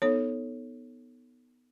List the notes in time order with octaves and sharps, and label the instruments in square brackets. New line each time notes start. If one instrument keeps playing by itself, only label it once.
[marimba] B3 D#4 A4 [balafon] C#5